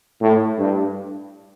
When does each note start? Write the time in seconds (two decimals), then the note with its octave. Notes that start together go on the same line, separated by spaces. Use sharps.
0.21 A2
0.58 G2